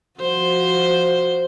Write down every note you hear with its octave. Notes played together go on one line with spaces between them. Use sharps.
F3 F#4 C5